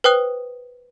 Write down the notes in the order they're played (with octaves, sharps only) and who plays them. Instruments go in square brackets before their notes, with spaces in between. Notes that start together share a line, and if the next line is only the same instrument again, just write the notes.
[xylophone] B4 C5 G5 D#6 F#6